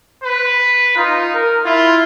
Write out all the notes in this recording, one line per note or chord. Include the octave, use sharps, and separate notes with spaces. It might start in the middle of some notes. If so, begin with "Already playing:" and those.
B4
D#4 F4
A#4
E4 F4